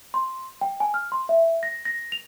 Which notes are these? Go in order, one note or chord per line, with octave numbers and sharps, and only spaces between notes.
C6
G5
G#5
F6
C6
E5
A#6
A#6
F7